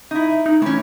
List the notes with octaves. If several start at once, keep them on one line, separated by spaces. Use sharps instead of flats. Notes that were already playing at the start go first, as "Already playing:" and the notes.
D#4 E4
D#4
E3 A3 C#4